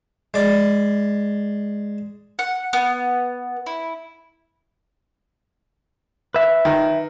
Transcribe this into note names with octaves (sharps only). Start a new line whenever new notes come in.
G#3 D5
F#5
B3
E4
B4 E5
D#3